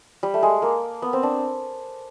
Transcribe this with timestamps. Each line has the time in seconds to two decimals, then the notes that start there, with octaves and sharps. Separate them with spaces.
0.23 G3
0.34 A3
0.43 G#3
0.62 A#3
1.02 B3
1.13 C4
1.23 D4